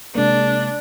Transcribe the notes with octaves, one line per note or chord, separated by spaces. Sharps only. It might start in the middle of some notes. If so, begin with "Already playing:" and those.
C3 G#3 A#3 D4